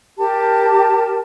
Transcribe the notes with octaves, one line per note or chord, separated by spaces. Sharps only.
G4 A#4 A5